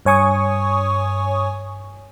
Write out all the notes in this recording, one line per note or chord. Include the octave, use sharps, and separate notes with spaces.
G2 C#5 G#5 C#6 D#6